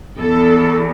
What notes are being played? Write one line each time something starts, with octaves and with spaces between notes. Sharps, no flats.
E2 A4